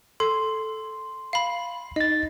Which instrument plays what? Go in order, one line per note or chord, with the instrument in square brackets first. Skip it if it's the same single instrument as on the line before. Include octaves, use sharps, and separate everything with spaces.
[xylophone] A4 [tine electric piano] C6
[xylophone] F5 B5
[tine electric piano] D#4 A6 [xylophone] D#5